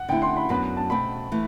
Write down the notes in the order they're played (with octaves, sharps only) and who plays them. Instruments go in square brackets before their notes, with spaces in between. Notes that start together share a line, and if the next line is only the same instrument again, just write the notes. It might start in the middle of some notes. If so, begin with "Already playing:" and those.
Already playing: [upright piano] F#5
[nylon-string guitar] D3 A3 C4 E4 [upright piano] G5
[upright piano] C6
B5
[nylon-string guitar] F#2 F#3 B3 D4 [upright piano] B5
[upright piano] A5
[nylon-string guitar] B2 A3 C4 [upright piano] B5
[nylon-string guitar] E3 A3